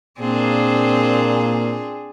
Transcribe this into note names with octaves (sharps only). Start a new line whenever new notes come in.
A#2 C4 D4 G#4